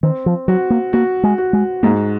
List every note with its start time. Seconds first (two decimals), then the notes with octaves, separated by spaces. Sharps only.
0.03 D#3 C4
0.26 F3
0.48 F#3 F#4
0.70 A#3
0.93 A#3 F#4
1.23 G#3
1.38 F#4
1.53 G#3
1.83 G#2 A#3